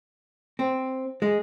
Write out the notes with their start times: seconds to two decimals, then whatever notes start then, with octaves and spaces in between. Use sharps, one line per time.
0.59 C4
1.22 G#3